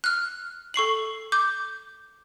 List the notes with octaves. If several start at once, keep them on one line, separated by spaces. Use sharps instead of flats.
F6 F#6
A4 C#6 C7 F#7
D6 G6